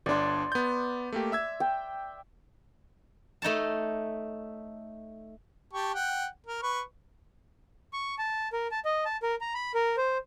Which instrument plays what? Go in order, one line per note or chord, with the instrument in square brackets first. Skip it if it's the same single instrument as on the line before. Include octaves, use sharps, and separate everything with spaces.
[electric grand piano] G1 D4 [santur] D5 C6
[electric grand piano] B3 G6
A3 A#3 G4
E5 E6 G#6
[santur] G5
[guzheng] A3 D#4 C#5 A5
[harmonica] G4 A5 C#6
F#5 G5
A#4
B4 C#6
[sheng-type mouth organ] C#6
A5
A#4
A5
D#5
A5
A#4
A#5
B5
A#4
C5